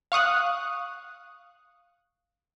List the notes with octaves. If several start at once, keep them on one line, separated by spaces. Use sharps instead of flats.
F5 C#6 D#6 F#6